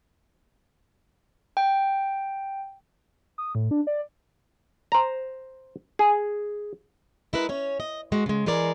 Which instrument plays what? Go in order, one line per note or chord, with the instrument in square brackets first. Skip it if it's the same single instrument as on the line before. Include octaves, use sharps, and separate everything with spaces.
[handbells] G5
[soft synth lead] D#6
A2
D4
D5
[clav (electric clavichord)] C5 A#5
G#4
[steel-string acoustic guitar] G#3 E4 A#4 B4
C#4 C#5
D#5
G#3 F#4
C#3 G#3
E3 G#3 G#4 A#4 D5